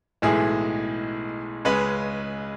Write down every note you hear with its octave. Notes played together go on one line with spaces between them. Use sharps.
B1 A2 E3 G#3 G#4
C#2 C#3 G#3 C#4 B4